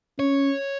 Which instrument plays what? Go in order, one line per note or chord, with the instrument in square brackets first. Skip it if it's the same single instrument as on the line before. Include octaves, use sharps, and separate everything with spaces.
[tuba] C#4 [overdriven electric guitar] C#5